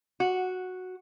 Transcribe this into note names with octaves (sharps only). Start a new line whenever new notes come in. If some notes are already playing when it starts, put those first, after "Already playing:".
F#4